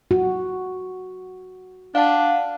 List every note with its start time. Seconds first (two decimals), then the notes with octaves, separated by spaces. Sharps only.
0.11 F#4
1.95 D4 F5 F#5 A5